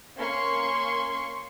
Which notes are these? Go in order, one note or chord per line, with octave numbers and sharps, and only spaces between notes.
A#3 C#4 C6 C#6